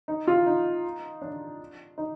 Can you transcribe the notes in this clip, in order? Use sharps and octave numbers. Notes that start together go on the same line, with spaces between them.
D#4
F4
D#4
D4
D#4